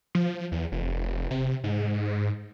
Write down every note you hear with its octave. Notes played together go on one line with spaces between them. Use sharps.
F3
E2
F1
C3
G#2